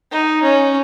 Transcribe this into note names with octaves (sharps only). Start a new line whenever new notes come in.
D#4
C#4